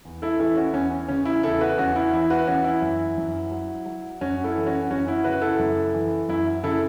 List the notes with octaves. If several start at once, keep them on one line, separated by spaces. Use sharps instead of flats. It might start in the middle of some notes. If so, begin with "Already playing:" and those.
E2
E4 A4
E3 E4 A4
C#4 F#4
E2 C#4
C#3 C#4
E4
E2 E4 A4
F#4 B4
E2 C#4 F#4
E4
E3 E4
F#4 B4
E3 C#4 F#4
E4
F#2
F#2
F#3
F#3
F#2 C#4 F#4
E4 A4
E3
C#4 F#4
F#2 C#4 F#4
E4
C#3 F#4 B4
E4 A4
F#2
E3
F#2 E4
C#3 E4 A4